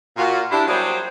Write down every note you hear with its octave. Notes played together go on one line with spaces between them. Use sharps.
A#2 F4 F#4
D4 E4 G4
F#3 G3 A#3 G#4 C5 D5